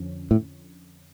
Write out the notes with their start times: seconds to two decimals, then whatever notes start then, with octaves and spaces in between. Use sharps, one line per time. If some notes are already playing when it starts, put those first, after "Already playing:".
Already playing: F2 D3 F3 C#4
0.31 A2